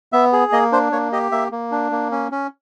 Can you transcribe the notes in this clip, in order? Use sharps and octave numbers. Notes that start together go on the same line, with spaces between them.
B3 E5
G#4
A#3 D#5
D4 C5
A#3 C#5
G4 D#5
A#3 E5
A#3
D4
A#3
C#4
C#4